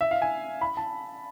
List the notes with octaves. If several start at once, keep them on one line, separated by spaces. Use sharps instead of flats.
E5
F5
G#5
B5
A5